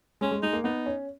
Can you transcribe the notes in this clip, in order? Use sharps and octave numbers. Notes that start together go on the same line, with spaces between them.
G#3 C#4
G#3
G#3 D#4
A#3
B3 D#4
C#4